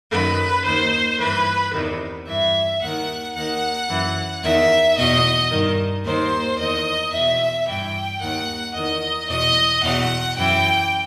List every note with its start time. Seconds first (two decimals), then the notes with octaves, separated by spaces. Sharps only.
0.12 F#2 D#3 B4
0.65 D#2 D#3 C5
1.19 G2 E3 B4
1.74 E2 C3 D#3
2.27 G2 E3 E5
2.81 D#2 D#3 F#5
3.35 D#2 D#3 F#5
3.89 F#2 E3
4.43 E2 D#3 E5
4.97 E2 B2 D#5
5.51 G2 D#3
6.04 D#2 D#3 C5
6.58 E2 D#3 D#5
7.13 E2 B2 E5
7.66 G2 E3 G5
8.20 D#2 D#3 F#5
8.74 E2 D#3 D#5
9.29 E2 B2 D#5
9.82 E2 B2 F#5
10.35 F#2 E3 G5